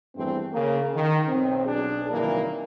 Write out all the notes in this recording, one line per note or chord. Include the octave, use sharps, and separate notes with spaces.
E2 G2 E3 A3 C4
C#3 A#3
D#3
B1 C4
B1 D4 G#4
C2 F#2 A#2 D#3 E3 A#3